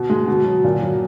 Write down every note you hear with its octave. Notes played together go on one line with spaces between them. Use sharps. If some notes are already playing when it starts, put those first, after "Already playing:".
Already playing: B2
G#3
B2
F#3
A#2
F#3